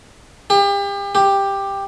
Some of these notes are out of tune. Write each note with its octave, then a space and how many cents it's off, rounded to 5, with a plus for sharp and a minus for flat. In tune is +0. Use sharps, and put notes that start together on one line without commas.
G4 +35
G4 +10